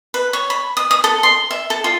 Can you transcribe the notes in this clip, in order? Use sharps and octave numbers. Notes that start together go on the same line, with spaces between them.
B4
C#5
B5
D#6
D#6
A4
C6
E5
A4
F4